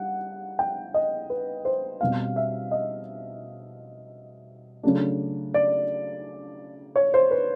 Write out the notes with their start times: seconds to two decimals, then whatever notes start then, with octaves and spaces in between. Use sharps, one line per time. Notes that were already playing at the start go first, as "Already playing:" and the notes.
Already playing: G3 F#5
0.59 G5
0.94 D#5
1.30 B4
1.65 C5
2.01 B2 G3 C4 F5
2.36 E5
2.71 D#5
4.83 C#3 F#3 A3 D4
5.54 D5
6.96 C#5
7.14 C5
7.31 B4